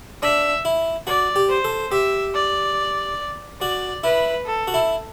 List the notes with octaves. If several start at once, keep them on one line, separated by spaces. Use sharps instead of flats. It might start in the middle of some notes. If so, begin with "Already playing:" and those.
D4 E5
E4
F#4 D5
G4
C5
A4
G4 E5
D5
F#4 D5
E4 B4
A4
F#4
E4